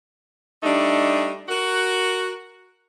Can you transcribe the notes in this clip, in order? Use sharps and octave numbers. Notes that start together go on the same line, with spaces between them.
G3 A3 D4 D#4
F#4 A#4